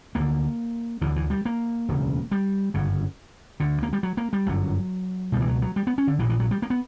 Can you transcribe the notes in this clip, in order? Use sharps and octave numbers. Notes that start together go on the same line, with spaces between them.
D2 A#3
D3
D2 D3 E3
E3
G3
A#3
E1 D2 C#3
G3
G1 F#2 C#3
D2 D3
A#3
G3
F#3
A#3
G3
G1 F#2 D3 F#3
C#2 B2 G3
E3
F#3
F#3
G3
B3
C#4
D3
A#1 A#2 E3
E3
F#3
G3
A#3
B3